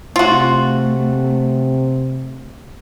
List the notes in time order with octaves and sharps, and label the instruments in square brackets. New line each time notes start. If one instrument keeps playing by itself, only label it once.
[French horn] C3 [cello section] A3 [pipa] F4 F#4